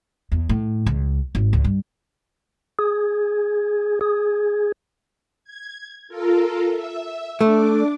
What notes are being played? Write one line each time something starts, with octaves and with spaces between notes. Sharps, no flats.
E2
A2
C#2
G#1
C#2
G2
G#4
G#4
G#6
F4 A4 A#4
E5
A3 D4 D6